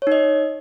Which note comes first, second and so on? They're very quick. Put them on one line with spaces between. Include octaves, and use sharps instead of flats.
C#5 D#4 D#5